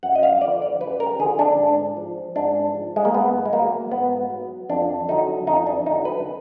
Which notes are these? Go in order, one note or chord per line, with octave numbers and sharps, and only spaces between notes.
F#2 F#5
D#5
F5
D3 F3 D5
D5
F#2 B4
A#4
D3 F3 G#4
D4
G#2
F3
G#2 D4
F3
G#3
A#3
G#2 B3
G#3
F#3 A#3
G#2 B3
F#3
F2 D4
D3 F#3 D#4
F2 D#4
D4
D3 F#3 D#4
B4